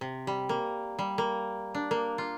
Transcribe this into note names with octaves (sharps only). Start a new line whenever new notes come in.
C3
G3
A#3
G3
A#3
D4
A#3
F4